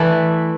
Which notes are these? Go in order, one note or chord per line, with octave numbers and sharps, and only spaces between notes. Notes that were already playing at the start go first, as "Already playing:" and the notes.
Already playing: E3 A3 E4 B4 D5